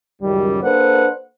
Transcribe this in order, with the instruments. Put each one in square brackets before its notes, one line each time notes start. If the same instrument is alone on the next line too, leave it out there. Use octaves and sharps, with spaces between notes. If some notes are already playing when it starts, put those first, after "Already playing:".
[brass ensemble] C#2 F#2 D#3 G3
A#3 D4 A4 B4 C5 F#5